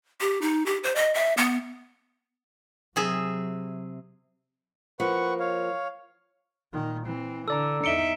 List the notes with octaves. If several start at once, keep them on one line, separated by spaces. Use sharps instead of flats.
G4
D#4
G4
C5
D#5
E5
B3
C3 F#3 G#4 E5
F3 A#3 B4 F#5 C#6
C#5 F5
A#2 D#3
E3 C4
D3 A4 D5 A#5 E6
E2 D#4 E5 C#7 D7 G7